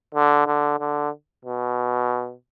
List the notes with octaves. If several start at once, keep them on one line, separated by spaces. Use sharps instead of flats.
D3
D3
D3
B2